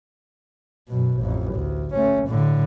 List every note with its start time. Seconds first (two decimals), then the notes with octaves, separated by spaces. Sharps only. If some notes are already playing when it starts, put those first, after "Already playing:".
0.89 F#2 B2
1.18 A1 F2
1.54 D2
1.95 A3 C#4
2.27 A2 D3